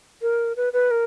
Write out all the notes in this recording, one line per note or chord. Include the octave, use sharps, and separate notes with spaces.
A#4
B4
B4
A#4